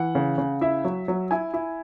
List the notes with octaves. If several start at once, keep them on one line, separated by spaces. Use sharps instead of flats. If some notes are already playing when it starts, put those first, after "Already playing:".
Already playing: E3 F#5
C#3
C#3
E4 E5
F#3
F#3
E4 G#5
E4